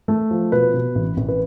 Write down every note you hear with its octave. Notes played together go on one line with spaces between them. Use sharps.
A3
F3
B2 B4
B2
A1
A1
B4